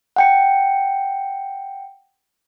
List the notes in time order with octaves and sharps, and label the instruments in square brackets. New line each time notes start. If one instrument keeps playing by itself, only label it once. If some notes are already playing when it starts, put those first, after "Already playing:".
[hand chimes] F#5 G5 C#7